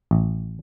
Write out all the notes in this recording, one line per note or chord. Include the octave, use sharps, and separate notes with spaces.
A1